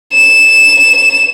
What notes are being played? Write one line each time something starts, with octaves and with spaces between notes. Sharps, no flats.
E7